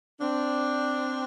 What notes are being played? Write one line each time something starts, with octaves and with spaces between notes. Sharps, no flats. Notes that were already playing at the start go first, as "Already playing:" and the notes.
C4 D4